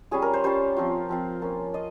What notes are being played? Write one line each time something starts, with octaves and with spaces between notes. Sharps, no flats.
G3 C#4 F4 G#4
A#4
C5
G3 C#4 F4 C5
F3 C4 F4
F3 C4 F4
A#3 C#4 F4
F4 D#5